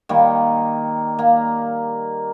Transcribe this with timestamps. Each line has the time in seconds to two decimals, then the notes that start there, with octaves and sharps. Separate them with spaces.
0.09 D#3 G3 A#3
1.19 A#3